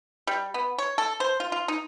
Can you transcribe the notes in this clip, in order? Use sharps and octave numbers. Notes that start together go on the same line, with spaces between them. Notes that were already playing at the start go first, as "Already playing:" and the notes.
G3
B3
C#5
A4
C5
F4
F4
D#4